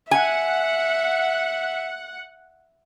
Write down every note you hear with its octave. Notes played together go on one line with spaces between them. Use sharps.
E5 F#5 G#5